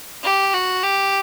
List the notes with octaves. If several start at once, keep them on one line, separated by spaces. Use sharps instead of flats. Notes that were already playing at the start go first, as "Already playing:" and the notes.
G4
F#4
G4